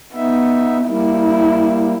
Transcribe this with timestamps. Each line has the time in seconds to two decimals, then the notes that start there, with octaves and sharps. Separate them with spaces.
0.15 B3 D#4 E5
0.87 G3 A#3 E4